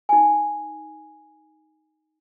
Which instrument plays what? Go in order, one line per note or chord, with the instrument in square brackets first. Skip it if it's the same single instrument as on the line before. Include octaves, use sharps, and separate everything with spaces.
[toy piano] D#4 G#5